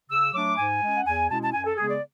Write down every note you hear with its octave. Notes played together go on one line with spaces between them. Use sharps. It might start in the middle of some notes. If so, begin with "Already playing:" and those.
C#3 E6
F#3 A3 D4 D6
G#2 G#5
G#3 C#4
F#5
E2 G#5
B2 G#3 C#4 E4 A5
A5
F#2 G#5
A4
C#3 G#3 B3 G#4
D5